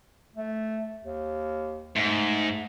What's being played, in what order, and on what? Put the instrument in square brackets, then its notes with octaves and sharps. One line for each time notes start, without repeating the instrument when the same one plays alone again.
[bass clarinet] A3
D#2
[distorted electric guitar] G#2 [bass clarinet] A3